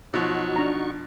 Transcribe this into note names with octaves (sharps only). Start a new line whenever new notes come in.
B2 F3 F#3 D#4 F#4 C#6
D4 A#5